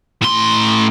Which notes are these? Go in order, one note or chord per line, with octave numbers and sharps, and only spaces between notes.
A2 C6